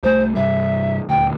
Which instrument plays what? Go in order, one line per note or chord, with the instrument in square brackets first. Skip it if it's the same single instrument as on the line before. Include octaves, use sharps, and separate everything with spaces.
[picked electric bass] C2 A3 [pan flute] C5
[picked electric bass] G2 C3 G3 [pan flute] E5
[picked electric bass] D#1 D2 [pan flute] G5